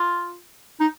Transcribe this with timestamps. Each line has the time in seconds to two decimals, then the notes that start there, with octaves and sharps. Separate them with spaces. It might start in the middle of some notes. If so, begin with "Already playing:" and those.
Already playing: F4
0.80 D#4